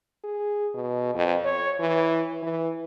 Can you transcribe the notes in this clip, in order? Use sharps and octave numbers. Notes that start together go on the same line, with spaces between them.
G#4
B2
F2
C#5
E3
E3